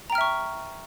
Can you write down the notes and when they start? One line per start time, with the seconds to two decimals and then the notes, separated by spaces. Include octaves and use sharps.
0.10 A#5
0.12 G5
0.15 F6
0.18 E5
0.21 C#6